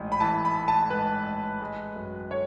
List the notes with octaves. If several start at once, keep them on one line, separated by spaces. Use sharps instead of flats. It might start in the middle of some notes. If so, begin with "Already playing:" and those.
Already playing: A1 G#2
B5
E3 A5
B5
A3
A5
G#2 B4
A1
G#3
F#2
D3 C#5